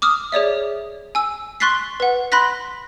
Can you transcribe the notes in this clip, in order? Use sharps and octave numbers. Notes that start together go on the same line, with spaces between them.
D6 D#6 F6
G#4 C#5 D5 E5
G#5 E6
C6 C#6 F#6 A6 B6 C7
B4 F#5
B5 C6 F#6 A#6 B6